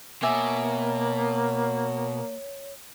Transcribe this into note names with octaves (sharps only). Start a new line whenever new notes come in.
B2 A#3 C#5 E5 G#5 D6